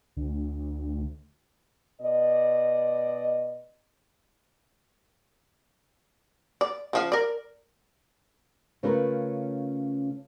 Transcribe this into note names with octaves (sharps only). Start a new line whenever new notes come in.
D2
B2 D5 D#5
D5
C#3 F3 F5
A#4 D5
C#3 A3 C#4 F4 A#4 B4